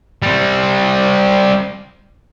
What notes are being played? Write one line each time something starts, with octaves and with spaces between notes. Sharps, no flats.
G3 C4